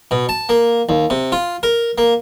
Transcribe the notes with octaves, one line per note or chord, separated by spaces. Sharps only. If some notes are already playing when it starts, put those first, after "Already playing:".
B2
A5
A#3
D#2
C3
F4
A#4
A#3